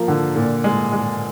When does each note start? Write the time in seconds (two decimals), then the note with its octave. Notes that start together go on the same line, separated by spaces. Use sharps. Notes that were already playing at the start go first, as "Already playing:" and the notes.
Already playing: F3 A#3
0.08 D3
0.36 A#2
0.64 G#3
0.92 G#3